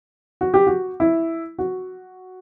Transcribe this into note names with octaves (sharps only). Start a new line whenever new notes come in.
F#4
G4
F#4
E4
F#4